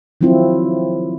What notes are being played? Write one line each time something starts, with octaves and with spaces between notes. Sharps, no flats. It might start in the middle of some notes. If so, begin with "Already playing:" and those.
D#3 F3 F#3 C4 E4 F4